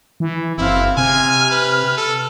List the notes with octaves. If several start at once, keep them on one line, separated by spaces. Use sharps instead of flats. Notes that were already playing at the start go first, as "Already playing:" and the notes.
E3
F#1 C4 E4 F5
C3 G#5 F6
B4
A4